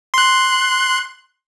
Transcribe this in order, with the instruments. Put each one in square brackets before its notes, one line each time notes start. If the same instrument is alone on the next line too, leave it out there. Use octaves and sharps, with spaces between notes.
[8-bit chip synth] C6 F#6